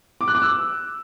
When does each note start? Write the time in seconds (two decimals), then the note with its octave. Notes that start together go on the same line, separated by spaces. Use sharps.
0.21 D6
0.28 F#6
0.35 D6
0.42 E6